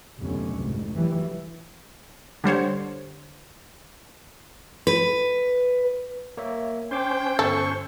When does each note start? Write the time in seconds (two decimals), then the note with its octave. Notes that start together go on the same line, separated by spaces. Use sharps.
0.21 F1 D#2 B2 D3 F#3 C#4
0.56 F1 C2 G#2
0.95 F2 E3 F#3 G3
2.44 D3 G3 C5 C#5
4.87 B4
6.37 A#3 C#5 E5
6.91 C#4 C5 G5 C6 D6
7.39 G1 A4 C#6 E6